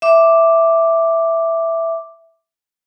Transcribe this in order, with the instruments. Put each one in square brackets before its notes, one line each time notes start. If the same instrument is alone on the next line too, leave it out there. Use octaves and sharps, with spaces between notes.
[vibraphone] E5 D6